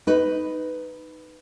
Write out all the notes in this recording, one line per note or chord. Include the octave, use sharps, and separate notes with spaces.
D#4 B4